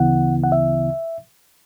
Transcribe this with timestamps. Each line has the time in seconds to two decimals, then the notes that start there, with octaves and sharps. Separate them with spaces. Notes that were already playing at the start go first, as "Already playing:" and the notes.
Already playing: D2 C#3 E3 B3 E4 F#5
0.44 F#5
0.52 E5